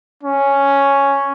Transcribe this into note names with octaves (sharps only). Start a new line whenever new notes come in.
C#4